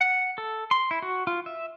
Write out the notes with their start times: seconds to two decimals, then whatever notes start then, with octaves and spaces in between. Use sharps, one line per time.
0.01 F#5
0.38 A4
0.71 C6
0.91 E4
1.02 F#4
1.27 F4
1.46 E5